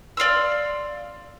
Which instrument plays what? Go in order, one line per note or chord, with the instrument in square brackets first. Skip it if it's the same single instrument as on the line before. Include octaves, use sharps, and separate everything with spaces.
[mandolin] D5 F5 C6 E6